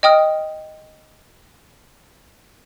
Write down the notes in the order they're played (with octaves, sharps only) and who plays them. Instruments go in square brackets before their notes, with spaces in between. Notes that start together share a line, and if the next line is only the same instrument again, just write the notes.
[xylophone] D#5 G5 D#6 F6